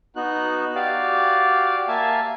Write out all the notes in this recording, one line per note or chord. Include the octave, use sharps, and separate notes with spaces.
B3 D#4 F#4 F#6
F#4 G4 D5 F5
A#3 E5 F5 G#5 A5